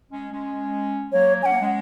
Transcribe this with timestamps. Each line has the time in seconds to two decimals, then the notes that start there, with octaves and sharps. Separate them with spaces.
0.11 G#3 C#4
0.32 G#3 C#4
1.12 F#3 A#3 C#5
1.43 C#4 F#5 G#5
1.51 A#3
1.60 G#3 C#4